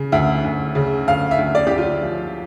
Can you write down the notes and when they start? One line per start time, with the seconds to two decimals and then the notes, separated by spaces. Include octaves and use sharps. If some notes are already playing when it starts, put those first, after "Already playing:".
Already playing: C#3
0.12 D2 E5
0.44 D2
0.75 C#3
1.08 D2 F5
1.31 E5
1.39 D2
1.55 D5
1.67 D2 G4
1.78 F4
2.02 F3